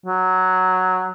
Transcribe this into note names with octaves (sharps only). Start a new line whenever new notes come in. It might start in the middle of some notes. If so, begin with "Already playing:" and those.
F#3